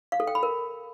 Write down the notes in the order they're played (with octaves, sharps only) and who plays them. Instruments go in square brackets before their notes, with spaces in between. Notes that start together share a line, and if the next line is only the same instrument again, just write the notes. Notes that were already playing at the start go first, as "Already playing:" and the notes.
[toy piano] F5
A4
G5
B5
A#4